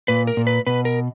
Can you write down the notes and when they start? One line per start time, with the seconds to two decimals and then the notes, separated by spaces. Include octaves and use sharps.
0.08 A#2 B4
0.27 A#4
0.37 A#2
0.47 B4
0.67 B2 B4
0.85 A#4